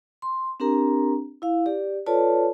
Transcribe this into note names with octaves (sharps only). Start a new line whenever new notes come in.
C6
C4 D4 G4 A#4 A#5
E4 F5
G4 D5
F4 A4 B4 C#5 D5 A5